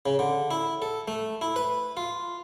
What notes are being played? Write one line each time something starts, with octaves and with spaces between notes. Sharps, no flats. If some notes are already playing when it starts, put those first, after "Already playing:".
C#3
D3
E4
A4
A3
E4
B4
F4